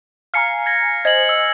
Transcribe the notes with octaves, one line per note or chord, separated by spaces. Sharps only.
F5 G#5 A#5 F6 C7 C#7
G#6 A#6
C5 D#5 G#5 G#6 A#6 F#7
E6